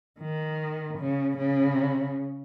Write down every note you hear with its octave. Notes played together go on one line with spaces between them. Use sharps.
D#3
C#3
C#3